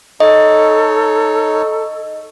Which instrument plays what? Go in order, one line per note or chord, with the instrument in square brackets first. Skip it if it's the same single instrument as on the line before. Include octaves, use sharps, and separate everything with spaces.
[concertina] D#4 C#5 [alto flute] A4 [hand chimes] D#5